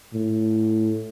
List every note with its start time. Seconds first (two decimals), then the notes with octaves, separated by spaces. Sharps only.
0.14 A2